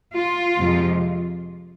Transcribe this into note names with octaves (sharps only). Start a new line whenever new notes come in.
F4
F2 C3 F3 G#3